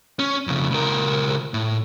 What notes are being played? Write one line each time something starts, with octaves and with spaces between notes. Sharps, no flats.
C#4
F2 C#3
C#2 A#4
A2